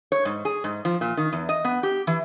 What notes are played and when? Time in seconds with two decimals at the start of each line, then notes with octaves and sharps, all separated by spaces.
0.12 C#5
0.25 G#2
0.45 G#4
0.64 G#2
0.85 F3
1.01 A#2
1.17 D#3
1.33 E2
1.49 D#5
1.65 B3
1.83 G4
2.07 E3